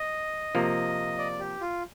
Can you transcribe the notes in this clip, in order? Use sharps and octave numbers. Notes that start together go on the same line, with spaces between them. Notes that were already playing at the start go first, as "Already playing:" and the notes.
Already playing: D#5
C3 F3 A#3
D5
G4
F4